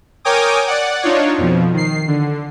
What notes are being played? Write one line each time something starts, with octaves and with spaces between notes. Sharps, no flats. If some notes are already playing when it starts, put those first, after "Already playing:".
A#4 C#5 G5 G#5 D6 D#6
D5 F#5
D4 D#4 F4 C#5
F2 B2 F3
D#3 C7
D3